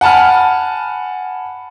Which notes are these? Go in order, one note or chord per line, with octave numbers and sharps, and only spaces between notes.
F#5 G#5 A5 B5 F6